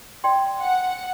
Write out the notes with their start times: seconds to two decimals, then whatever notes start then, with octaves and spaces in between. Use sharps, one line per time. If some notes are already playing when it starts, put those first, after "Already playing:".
0.24 D5 G5 C6
0.60 F#5